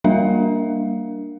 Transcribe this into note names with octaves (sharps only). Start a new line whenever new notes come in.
G3 A#3 D4 A#4 E5 F5